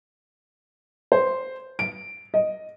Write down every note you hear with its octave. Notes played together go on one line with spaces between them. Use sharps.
C5
D7
D#5